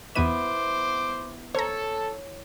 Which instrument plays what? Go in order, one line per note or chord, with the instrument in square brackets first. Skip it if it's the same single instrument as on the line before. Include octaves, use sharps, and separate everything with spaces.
[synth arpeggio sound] E2 D#7 [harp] B3 E4 E5 [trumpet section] C5 D6
[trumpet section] A4 [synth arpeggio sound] C5 A#5 [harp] C#5